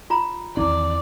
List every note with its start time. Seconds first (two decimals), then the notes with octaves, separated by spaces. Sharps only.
0.10 F4 A#5
0.57 E2 D#3 C4 E4 D5